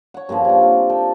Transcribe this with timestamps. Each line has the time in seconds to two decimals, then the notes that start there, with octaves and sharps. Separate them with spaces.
0.14 C#5 F#5
0.29 G2 A#2 C#3 F3
0.45 C#5 D5 F#5
0.61 C3 F4
0.90 A4 G5